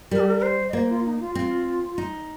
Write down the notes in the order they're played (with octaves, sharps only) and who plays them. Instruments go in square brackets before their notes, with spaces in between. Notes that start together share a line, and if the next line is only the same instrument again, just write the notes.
[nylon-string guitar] G3 [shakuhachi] A#4
[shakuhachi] G4
A#4
A#4
C5
D#5
[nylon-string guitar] A#3 [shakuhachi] C5
[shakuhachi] F4
D#4
F4
[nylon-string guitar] C4 [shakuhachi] F4
[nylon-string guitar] D#4